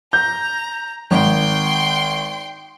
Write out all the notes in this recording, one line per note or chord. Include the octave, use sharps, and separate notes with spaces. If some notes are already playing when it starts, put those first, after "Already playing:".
A#5 G6
G#1 G5 C6